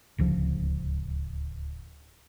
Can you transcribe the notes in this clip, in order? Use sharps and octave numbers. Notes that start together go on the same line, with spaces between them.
D1 C#2 F3